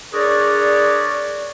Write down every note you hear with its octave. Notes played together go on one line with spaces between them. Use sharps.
D4 G#4 A#4 B4 C#5 D5